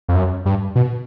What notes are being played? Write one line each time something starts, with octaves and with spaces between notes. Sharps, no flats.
F2
F#2
G2
B2